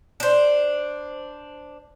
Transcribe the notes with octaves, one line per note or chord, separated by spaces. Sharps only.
D4 C5